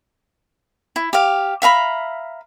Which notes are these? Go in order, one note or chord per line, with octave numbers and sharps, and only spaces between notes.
E4
G4 F5
E5 F5 A#5 B5